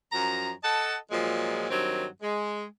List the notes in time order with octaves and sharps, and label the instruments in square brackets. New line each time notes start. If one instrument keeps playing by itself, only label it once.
[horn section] F#2 F3 A#5
A4 D#5 F#5 A5
A#2 F3 F#3 G#3
G2 D#3 F#3 C4
G#3